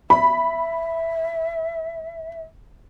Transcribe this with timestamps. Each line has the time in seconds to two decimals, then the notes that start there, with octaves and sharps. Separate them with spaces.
0.10 E5 B5